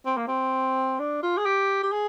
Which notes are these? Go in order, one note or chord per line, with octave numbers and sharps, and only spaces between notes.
C4
A#3
C4
D4
F4
G#4
G4
G4
G#4